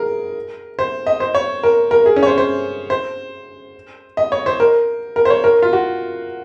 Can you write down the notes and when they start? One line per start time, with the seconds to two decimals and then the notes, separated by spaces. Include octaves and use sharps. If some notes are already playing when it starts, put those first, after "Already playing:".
Already playing: G#4 A#4
0.79 C5
1.07 D#5
1.20 C5
1.35 C#5
1.63 A#4
1.91 A#4
2.06 G#4
2.16 C#4
2.23 C#5
2.27 C5
2.38 C5
2.90 C5
4.17 D#5
4.32 C#5
4.46 C5
4.60 A#4
5.16 A#4
5.25 C5
5.30 C#5
5.44 A#4
5.62 F4
5.73 F#4